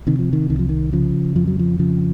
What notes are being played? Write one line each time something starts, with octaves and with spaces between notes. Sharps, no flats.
C3 D#3
F3
D#3
C2 D#3
F3
D#3
C#3 F3
F2 F3
F#3
F3
C#3 F3